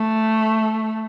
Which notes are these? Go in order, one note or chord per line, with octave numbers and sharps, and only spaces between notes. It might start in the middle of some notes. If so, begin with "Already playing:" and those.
Already playing: A3